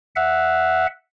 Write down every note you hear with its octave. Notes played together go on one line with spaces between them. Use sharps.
E5 F#5